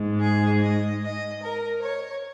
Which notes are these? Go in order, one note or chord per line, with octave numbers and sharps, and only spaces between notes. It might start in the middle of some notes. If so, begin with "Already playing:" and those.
Already playing: G#2 G#3
G#4
D#5
D#5
A#4
C#5